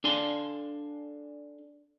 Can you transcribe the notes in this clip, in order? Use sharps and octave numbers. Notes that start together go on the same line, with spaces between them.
D4 A4 F5 G#5 C6